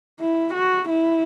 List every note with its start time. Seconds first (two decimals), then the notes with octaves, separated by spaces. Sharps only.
0.19 E4
0.54 F#4
0.89 E4